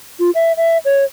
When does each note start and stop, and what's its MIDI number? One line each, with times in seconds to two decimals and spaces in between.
0.20 0.30 65
0.35 0.52 76
0.57 0.78 76
0.85 1.04 73